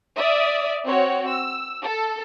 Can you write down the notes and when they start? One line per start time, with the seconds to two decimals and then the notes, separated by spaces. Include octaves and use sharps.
0.18 D5 E5 D#6
0.86 C4 F#4 C#5
1.30 E6
1.84 A4